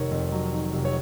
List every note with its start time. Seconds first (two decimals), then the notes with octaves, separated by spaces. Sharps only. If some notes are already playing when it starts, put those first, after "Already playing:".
Already playing: F1 D#3 A#4 C#5
0.11 F2
0.32 F#3
0.53 D#3
0.73 F1
0.85 C#5